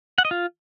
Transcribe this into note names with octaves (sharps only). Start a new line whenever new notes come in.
F#5
D#5
F4